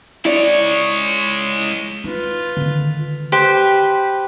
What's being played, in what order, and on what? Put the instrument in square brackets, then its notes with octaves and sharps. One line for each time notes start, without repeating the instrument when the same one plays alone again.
[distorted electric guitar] G#3 C#5 [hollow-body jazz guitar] E4 D5
[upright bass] D#4 [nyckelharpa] F4 B4
[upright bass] D3 D#3
[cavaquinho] G4 B4 C5